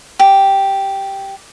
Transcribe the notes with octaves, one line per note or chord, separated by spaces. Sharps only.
G4